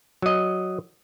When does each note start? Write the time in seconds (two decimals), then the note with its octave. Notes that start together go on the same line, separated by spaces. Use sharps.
0.22 F#3 D#5